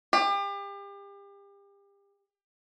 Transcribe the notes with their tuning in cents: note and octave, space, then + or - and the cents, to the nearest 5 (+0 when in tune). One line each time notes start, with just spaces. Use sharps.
G4 +35